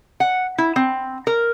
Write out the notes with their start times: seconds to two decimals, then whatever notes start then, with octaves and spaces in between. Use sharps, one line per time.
0.20 F#5
0.58 E4
0.76 C4
1.27 A#4